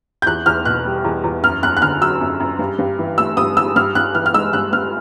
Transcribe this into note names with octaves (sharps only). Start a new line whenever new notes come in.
G6
E2 F#6
E2 F6
B2 F#6
G3
E2
E2
F#2 F6
F#2 F#6
F#6
D3 F6
F#3 E6
F#2
F#2
G2
G2
E3
A3 E6
G2 D#6
G2 E6
G2 F6
G2 F#6
E3 F6
F6
G#3 E6
G2 F#6
G2 F6